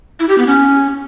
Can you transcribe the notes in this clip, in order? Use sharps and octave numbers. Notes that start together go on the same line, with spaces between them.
E4
G4
B3
C#4